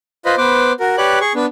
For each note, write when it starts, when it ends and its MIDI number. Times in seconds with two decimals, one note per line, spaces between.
0.25 0.35 65
0.25 0.35 71
0.25 0.35 72
0.25 0.35 75
0.25 0.35 83
0.38 0.72 59
0.38 0.72 71
0.38 0.72 72
0.38 0.72 86
0.80 0.96 66
0.80 0.96 70
0.97 1.19 67
0.97 1.19 71
0.97 1.19 73
0.97 1.19 74
0.97 1.19 90
1.21 1.33 68
1.21 1.33 85
1.35 1.46 59
1.35 1.46 62